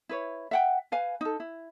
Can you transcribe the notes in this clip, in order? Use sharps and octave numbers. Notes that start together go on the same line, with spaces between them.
E4 B4 C#5
E5 F#5 G5
B4 F5 G#5
D#4 A4
E4